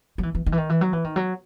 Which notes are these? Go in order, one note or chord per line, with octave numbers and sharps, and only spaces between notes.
F#3
E3
E3
D#3
E3
D#3
E3
F#3
E3
D#3
F#3